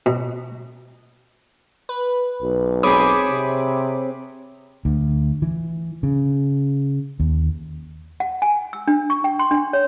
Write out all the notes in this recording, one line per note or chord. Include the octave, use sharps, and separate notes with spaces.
B2
B4
B1
C4 G#4 C#5 B5 D6 D#6
C3
D2
E3
C#3
D#2
F#5
G#5
E6
D4
C#6
G5
C6
D4
C#5